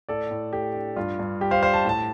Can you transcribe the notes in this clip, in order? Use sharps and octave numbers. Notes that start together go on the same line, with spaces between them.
A2 A4 D5
A2
A3 G4
D4
G2 F4
G2
G3 G4
C5 F5
D4 C5 F5
A5
A2 A5